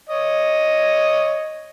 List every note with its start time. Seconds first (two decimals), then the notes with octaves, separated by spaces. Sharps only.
0.10 C#5 D#5